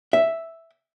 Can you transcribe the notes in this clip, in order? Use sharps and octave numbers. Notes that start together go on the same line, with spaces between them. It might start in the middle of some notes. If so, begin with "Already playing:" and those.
E5